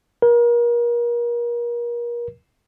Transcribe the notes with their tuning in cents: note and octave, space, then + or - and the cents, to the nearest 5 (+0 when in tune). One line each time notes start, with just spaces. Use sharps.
A#4 +35